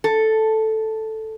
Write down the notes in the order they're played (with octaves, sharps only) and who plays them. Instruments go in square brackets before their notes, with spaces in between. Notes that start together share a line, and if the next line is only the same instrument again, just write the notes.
[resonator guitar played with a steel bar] A4